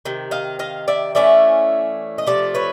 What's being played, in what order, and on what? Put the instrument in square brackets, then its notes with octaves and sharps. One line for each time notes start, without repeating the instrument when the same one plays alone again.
[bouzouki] C3 D#3
D#5 F5
D#5 F5
D5 E5
E3 A3 C#4 D5 E5
D#5
C3 F3 A3 D5
B4 C#5